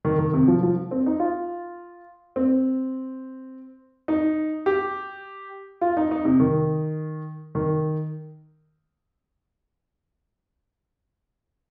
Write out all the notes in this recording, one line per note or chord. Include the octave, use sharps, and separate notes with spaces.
D#3
D#3
C3
F3
F3
C4
D#4
F4
C4
D#4
G4
F4
D#4
D#4
C3
D#3
D#3